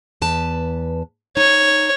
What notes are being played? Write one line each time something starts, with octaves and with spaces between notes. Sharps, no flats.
E2 B4 A5
D#4 C#5